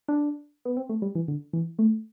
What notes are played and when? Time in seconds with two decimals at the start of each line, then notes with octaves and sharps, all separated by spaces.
0.08 D4
0.65 B3
0.77 C4
0.89 A3
1.02 G3
1.15 E3
1.28 D3
1.53 E3
1.79 A3